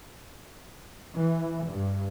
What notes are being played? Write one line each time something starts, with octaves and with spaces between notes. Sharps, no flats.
E3
G2